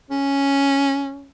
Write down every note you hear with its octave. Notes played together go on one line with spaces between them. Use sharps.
C#4